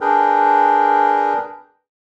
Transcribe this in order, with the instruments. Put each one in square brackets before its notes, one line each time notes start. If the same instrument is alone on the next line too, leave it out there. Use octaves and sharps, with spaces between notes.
[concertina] D4 G#4 A#4 B4 G5